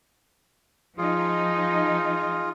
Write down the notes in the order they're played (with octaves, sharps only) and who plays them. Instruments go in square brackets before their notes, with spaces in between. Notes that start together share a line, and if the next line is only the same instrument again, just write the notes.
[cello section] F3 D#4 [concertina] F4 G#4